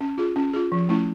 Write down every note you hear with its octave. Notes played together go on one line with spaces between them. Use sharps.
C#4
F4 G#4
C#4
F4 G#4
F3
A3 C#4 E4